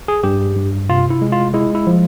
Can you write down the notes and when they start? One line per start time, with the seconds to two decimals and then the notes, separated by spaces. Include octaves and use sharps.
0.08 G#4
0.23 G2 G4
0.56 G2
0.89 C3 F4
1.10 E4
1.22 G#3
1.32 F4
1.54 G#3 E4
1.75 E4
1.87 F3